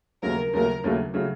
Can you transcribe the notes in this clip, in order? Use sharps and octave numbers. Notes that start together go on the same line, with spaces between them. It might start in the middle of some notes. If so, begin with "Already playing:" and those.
D#2 C#3 F#3 A3 A#4
D#2 C#3 F#3 A3 A#4
D#2 C#3 F#3 A3
C#3 F#3 A3